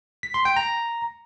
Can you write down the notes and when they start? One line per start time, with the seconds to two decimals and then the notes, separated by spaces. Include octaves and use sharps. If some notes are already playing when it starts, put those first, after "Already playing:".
0.23 B6
0.34 C6
0.45 G5
0.56 A#5